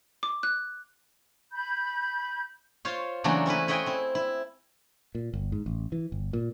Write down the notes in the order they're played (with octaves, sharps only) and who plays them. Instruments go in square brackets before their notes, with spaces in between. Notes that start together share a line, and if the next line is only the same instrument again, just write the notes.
[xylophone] D6
F#6
[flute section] B5 G6
[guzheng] F4 C5 C#5 F5
C#3 E3 F#3 A3 A#3 D4
C4 C#4 E4 B4
B4 C#5 D#5 E5 G5 G#5
C4 E4
E4
[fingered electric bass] A#2
G1
G#2
A1
E3
G1
A#2